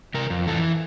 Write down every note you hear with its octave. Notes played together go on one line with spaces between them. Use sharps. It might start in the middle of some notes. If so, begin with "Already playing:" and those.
C3 A#4
F2
E3 A4